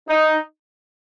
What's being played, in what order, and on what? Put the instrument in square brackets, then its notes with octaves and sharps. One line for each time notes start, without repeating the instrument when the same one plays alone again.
[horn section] D#4